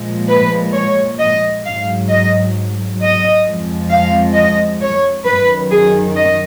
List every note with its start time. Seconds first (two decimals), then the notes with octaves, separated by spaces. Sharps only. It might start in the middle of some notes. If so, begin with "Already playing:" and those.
Already playing: A#2 F3 G#3
0.28 B4
0.73 C#5
1.19 D#5
1.64 G#2 F#3 F5
2.10 D#5
3.00 D#5
3.44 F2 F3 G#3
3.90 F5
4.34 D#5
4.81 C#5
5.25 F#2 D#3 F#3 B4
5.70 G#4
6.16 D#5